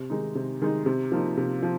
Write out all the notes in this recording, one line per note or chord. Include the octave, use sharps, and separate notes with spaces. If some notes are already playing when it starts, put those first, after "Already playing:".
Already playing: C3
D#3 G#3 D#4
C3
D#3 G#3 D#4
C3
F3 A#3 D#4
C3
F3